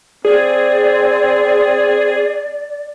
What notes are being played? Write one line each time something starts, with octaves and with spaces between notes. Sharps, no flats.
C4 G#4 D5